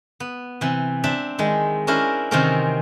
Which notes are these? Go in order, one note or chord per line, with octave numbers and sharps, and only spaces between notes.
B3
C3 E3
C4 D4 E5 A5
D#3 G#3 E4
C#4 D4 E4 A#4 C5
C3 D#3 E3 C4 C#4 A#4